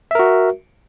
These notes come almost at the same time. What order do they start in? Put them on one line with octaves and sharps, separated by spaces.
E5 A#4 F#4